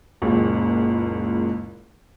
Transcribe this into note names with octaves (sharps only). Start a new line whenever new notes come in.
F#1 C#2 A#2 G#3